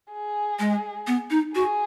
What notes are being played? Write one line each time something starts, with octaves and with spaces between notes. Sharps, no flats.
G#4
G#3
B3
D#4
F#4 G#4